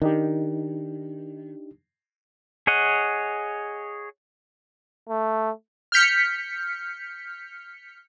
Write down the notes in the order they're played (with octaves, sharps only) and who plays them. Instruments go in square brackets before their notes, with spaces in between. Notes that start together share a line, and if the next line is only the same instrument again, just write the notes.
[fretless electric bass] D#3 [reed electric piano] D4 D#4 G4
[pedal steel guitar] G#4 C#5 D#5 F#5
[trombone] A3
[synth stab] F6 G6 B6 C#7